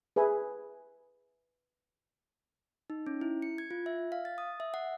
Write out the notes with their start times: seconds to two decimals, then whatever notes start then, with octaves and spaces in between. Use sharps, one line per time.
0.16 G#4 B4 E5 G#5
2.90 D#4
3.06 C#4
3.21 E4
3.42 C#7
3.58 G#6
3.71 F4
3.86 E5
4.12 F5
4.25 A6
4.38 D#6
4.60 E5
4.74 F#5